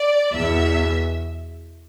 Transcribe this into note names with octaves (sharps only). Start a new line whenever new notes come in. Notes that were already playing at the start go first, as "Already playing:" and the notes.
Already playing: D5
E2 B2 E5